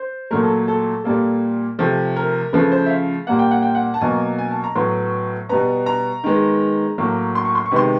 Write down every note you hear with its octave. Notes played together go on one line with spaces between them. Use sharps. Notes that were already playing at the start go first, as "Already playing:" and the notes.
Already playing: C5
A#2 F#3 A3 A#4
A4
A4
A#2 G3 A#3 A4
C3 F3 A3
A#4
C#3 F3 A3 B4
C5
E5
F5
A#2 G3 A#3 F#5
G5
F#5
G5
F#5
A5
B2 F#3 A#3 G#5
G#5
A5
A#5
A2 F#3 B3 C6
B2 G3 B3 A#5
A#5
D#3 G#3 B3
A2 F#3 A#3
C6
C#6
C6
C#6
C3 D#3 G#3 B3 C6